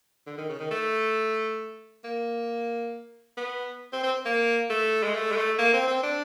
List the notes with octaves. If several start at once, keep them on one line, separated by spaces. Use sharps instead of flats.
D3
D#3
C#3
D#3
A3
A#3
B3
C4
C4
A#3
A3
G#3
A3
G#3
A3
A#3
C4
C4
D4